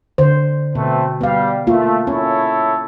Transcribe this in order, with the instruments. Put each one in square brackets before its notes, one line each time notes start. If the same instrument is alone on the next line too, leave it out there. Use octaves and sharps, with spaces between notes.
[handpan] D3 C5
[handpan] B2 [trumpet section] A3 C4 B4
[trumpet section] G3 [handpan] B3 F5
[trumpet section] A3 [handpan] A#3 F4
[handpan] C#4 [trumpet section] E4 A4 C#5